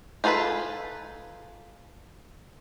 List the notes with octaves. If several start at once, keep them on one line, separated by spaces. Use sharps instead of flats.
D#4 F4 G#4 A4 B4